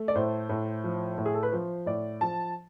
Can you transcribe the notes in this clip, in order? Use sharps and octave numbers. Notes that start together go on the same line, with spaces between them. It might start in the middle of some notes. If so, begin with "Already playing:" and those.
Already playing: A3
D5
A2 C5
A2
F3
A2
G#4
A4
B4
F3 C5
A2 D5
F3 A5